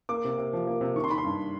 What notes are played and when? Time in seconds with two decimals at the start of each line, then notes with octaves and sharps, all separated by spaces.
0.09 A#3 D6
0.24 C3
0.38 C3
0.53 F3
0.67 A#3
0.81 C3
0.96 D#3 C#6
1.04 C6
1.10 D#3 B5
1.18 C6
1.24 G2